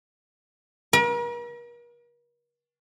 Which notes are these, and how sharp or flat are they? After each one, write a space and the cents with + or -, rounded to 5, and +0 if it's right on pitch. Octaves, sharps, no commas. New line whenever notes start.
A#4 +45